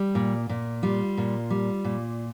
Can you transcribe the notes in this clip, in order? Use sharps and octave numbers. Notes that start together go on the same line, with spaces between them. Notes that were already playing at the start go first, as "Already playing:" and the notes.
Already playing: G3
A#2
A#2
G3 F4
A#2
G3
A#2